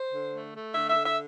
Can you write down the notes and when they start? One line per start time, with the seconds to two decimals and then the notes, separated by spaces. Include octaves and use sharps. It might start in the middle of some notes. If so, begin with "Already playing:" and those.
Already playing: C5
0.13 D3
0.34 A3
0.54 A3
0.74 D3 E5
0.90 E5
0.95 D3
1.05 E5